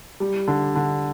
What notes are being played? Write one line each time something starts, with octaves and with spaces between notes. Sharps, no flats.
G3
D3
D3